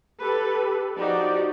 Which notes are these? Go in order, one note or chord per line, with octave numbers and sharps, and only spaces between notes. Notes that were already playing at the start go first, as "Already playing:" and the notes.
G4 A4 B4
F3 D#4 F#4 G4 D5